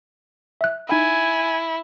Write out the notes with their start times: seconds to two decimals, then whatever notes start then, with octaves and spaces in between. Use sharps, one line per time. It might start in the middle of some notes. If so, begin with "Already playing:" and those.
0.61 E5 F#6
0.89 D#4 E4 G#5 B5